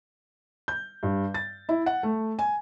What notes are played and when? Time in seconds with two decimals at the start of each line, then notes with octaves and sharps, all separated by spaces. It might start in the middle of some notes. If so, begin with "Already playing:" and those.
0.68 G6
1.03 G2
1.34 A6
1.69 E4
1.86 F#5
2.03 A3
2.39 G#5